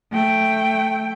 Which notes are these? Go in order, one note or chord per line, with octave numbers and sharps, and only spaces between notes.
A3 G5